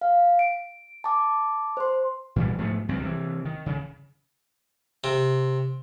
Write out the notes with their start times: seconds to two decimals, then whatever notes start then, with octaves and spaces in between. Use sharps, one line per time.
0.01 F5
0.39 D7
1.04 A5 D6
1.77 C5 C6
2.36 A#2 E3 G3
2.58 G#2 F3 A3 B3
2.89 C#2 G2 F3 C4
3.03 C3 E3
3.45 D#3
3.66 C#3
5.04 C3